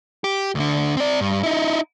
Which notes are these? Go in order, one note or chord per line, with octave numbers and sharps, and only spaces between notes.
G4
D2 D3
C4 D5
G2
D#4 E4